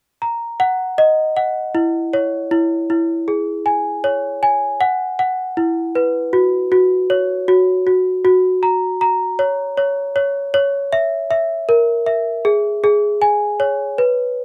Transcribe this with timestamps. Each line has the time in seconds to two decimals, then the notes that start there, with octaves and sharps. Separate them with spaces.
0.22 A#5
0.60 F#5
0.98 D#5
1.37 F#5
1.75 E4
2.13 C#5
2.51 E4
2.90 E4
3.28 G#4
3.66 G#5
4.04 C#5
4.43 G#5
4.81 F#5
5.19 F#5
5.57 E4
5.95 B4
6.33 F#4
6.72 F#4
7.10 C#5
7.48 F#4
7.87 F#4
8.25 F#4
8.63 A#5
9.01 A#5
9.39 C#5
9.77 C#5
10.16 C#5
10.54 C#5
10.92 E5
11.31 E5
11.69 A#4
12.06 E5
12.45 G#4
12.84 G#4
13.22 G#5
13.60 C#5
13.98 B4